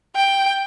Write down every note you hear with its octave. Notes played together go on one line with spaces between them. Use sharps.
G5